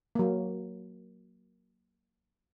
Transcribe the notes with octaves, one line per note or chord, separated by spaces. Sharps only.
F#3 A#3